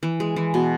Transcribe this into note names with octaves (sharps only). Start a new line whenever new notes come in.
E3
G#3
E3
B2